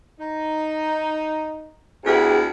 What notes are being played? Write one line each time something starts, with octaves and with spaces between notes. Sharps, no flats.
D#4
D2 B3 E4 G4 G#4